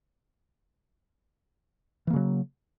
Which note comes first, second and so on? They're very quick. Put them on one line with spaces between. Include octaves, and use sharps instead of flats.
E3 A#3 C#3 F#3